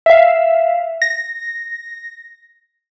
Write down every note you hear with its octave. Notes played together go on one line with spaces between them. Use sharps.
E5 F5
A#6